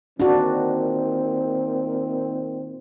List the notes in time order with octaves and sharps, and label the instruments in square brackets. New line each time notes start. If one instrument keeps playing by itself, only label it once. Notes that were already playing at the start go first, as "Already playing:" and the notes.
[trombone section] A#2 D#3 C4 [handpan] D4 F#4